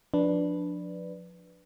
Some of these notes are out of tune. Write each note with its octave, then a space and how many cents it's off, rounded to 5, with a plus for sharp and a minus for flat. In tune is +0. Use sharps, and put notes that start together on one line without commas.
F3 +20 D4 +0 B4 +0